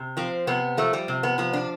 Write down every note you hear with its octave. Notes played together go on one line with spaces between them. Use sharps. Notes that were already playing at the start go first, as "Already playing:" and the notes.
Already playing: C3
F3 C4
C3 B3
F3 A3
G3
C3
B3
F3 B3
D4